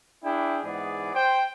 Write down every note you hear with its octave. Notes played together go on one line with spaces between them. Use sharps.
D4 E4 G#4 G5
G#2 E3 B3 G#4 D5
C5 G5